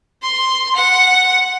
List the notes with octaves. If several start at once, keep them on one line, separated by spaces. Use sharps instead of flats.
C6
F#5